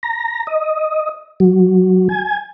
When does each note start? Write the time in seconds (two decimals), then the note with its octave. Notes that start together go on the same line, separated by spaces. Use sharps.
0.03 A#5
0.47 D#5
1.40 F#3
2.09 G#5